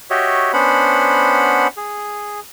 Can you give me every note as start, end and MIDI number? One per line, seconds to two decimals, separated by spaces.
0.10 0.52 66
0.10 0.52 67
0.10 0.52 73
0.10 0.52 75
0.10 0.52 76
0.53 1.67 59
0.53 1.67 61
0.53 1.67 62
0.53 1.67 72
0.53 1.67 78
0.53 1.67 83
1.77 2.40 68